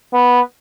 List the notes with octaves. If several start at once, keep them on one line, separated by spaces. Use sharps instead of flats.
B3